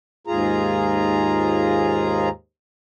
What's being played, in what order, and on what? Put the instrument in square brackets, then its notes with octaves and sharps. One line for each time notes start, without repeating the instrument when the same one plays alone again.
[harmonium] D#2 G#2 F4 G#4 A#5